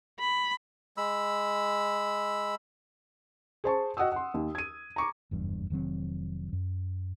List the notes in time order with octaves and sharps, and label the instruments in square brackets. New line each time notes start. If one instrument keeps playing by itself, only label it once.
[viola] B5
[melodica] G#3 B5 E6
[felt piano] G#4 C5 A5 C#6
F#4 D#5 F#5 G5 D#6 E6
F#5 C6
D#2
G#6 D#7
A#5 C#6 D6
[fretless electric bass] F#1 E2 G2
F1 D#3 F#3 C4
F#2